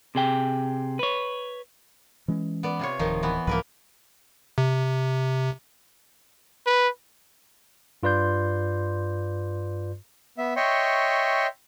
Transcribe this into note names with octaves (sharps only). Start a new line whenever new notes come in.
C3 G#4 G5
B4 C#5
E3 G#3 C#4
B3 D5
C3 F4 C#5
D1 D#3 F3 D#4
E3 B3
C2 G#2 F3 A#3 A#4 B4
C3
B4
G2 F4 B4 D5 C6 G6
B3 E5
C#5 D#5 E5 G5 C6 C#6